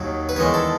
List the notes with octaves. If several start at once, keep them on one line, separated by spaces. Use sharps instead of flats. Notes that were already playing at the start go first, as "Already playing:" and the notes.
Already playing: D#2 D#3 F#3
B4
E2 D#3 G#3 C#5
A4